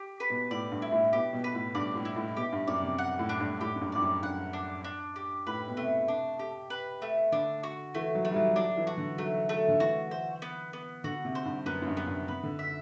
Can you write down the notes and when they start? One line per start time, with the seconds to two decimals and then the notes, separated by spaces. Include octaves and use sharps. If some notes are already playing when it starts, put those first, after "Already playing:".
Already playing: G4
0.20 B4
0.30 B2
0.51 A2 D5
0.71 G2
0.82 E4
0.92 A2
1.13 B2 G4
1.33 B2
1.44 B4
1.54 A2
1.75 G2 D5
1.95 A2
2.05 E4
2.16 A2
2.37 B2 G4
2.52 G2
2.67 F#2 D5
2.83 C3
2.98 F#5
3.19 A2
3.29 D4
3.40 G2
3.61 A2 G4
3.76 F#2
3.81 G2
3.92 G2 D5
4.02 F#2
4.22 G2 F#5
4.53 D4
4.84 D4
5.16 G4
5.47 A2 B4
5.68 B2
5.77 C3 A3
6.08 D4
6.39 G4
6.70 B4
7.02 A3
7.32 D3 D4
7.63 F#4
7.95 E3 A3
8.15 F#3
8.25 A3
8.31 G3
8.36 F#3
8.56 F#3 D4
8.77 E3
8.87 F#4
8.98 D3
9.18 F#3 A3
9.49 A3
9.68 D3
9.80 E3 F#4
10.11 C5
10.42 B3
10.73 B3
11.04 D3 F#4
11.25 C3
11.35 C5
11.45 G2
11.66 F#2 B3
11.82 F#2
11.87 G2
11.97 B3
12.07 G2
12.28 C3 B4
12.43 D3
12.59 E5